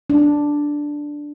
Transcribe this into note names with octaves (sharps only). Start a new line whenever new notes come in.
D4